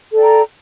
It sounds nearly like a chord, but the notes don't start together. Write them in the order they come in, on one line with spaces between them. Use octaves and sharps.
A4 D5 G5 A#5